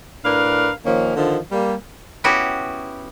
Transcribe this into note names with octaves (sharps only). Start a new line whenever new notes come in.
A2 D4 A#4 B4 F5
D#3 F3 A#3 C#4
D3 D#3 F3
G3 A#3
B3 C#4 E4 F#4 G4